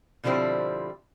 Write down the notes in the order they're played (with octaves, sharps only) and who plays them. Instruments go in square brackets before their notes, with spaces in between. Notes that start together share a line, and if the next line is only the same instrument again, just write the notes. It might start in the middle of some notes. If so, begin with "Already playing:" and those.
[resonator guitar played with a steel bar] B2 D3 F3 G3 C4 E4